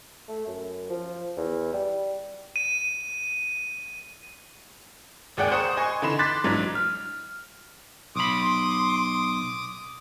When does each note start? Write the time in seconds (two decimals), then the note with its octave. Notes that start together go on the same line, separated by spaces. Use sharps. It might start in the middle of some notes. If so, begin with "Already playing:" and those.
0.28 A3
0.47 F#2
0.89 F3
1.37 E2
1.73 G3
2.56 D#7
5.37 G#1 D#2 G#4 D5 F#5 G5
5.52 C5 F#5 A#5 C#6 D#6
5.76 D#5 G#5 C6 C#6
6.02 D3 E3 D#4 B5 C6 E7
6.19 C6 D6 F#6 A6 B6
6.44 B1 G#2 E3 F#3 D4
6.75 F6
8.16 B1 B5 C6 D6 D#6